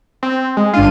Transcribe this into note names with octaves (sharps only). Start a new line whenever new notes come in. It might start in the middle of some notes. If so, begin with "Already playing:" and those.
C4
G#3
G1 D4 F4 D#7